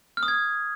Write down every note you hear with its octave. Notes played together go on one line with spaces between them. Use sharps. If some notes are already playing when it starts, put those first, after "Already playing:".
F6
D#6
G#6